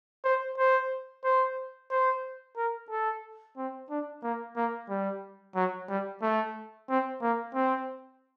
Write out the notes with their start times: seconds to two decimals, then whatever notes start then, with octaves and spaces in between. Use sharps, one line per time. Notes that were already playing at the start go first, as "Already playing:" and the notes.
0.24 C5
0.58 C5
1.24 C5
1.91 C5
2.57 A#4
2.90 A4
3.57 C4
3.90 D4
4.23 A#3
4.56 A#3
4.89 G3
5.55 F#3
5.89 G3
6.22 A3
6.89 C4
7.22 A#3
7.54 C4